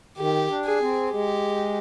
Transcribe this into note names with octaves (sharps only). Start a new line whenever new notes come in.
D#3 G4
D4
G#4
C4
G#3 G4